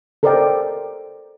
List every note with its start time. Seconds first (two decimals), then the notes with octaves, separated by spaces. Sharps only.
0.23 A4 A#4 C5 D5 D#5 G5